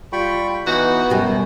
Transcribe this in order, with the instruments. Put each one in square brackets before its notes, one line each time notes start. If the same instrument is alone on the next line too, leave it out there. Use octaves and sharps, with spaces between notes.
[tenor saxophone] G3 [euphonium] F4 [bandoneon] G5 B5 C#6
[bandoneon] E3 D#4 [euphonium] B3 [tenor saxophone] F#4
[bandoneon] F#2 [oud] B2 G3